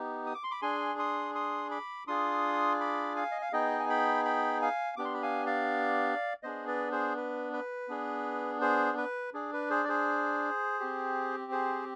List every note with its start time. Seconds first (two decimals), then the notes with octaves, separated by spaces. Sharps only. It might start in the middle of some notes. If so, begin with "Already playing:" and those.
Already playing: B3 D#4 G4
0.26 D#6
0.35 D6
0.44 C6
0.51 B5 D6
0.62 D4 G#4 G#5 C6
0.99 C6 D#6
1.35 C6 D#6
1.71 B5 D6
2.07 D4 F4 G#4 C6 D#6
2.80 B5 D6
3.16 F5 G#5
3.31 D#5
3.42 F5
3.53 B3 D#4 G#4 D#5 G5
3.80 G#5
3.89 G5 B5
4.25 G5 B5
4.62 F5 G#5
4.97 B3 D4 G4 D6
5.05 C6
5.14 B5
5.22 F5 G#5
5.46 D5 F5
6.43 B3 D4 G#4 C5 D#5
6.67 B4 D5
6.91 G#4 C5
7.17 B4
7.53 B4
7.88 B3 D4 G#4
8.61 G#4 C5
8.97 B4
9.34 D4 G#4
9.53 B4
9.70 G#4 C5
9.84 D5
9.89 G#4 C5
10.80 C4 G4
11.52 G#4 C5